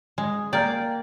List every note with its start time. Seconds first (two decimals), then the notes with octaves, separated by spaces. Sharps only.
0.18 G#3
0.53 A#3 D5 G5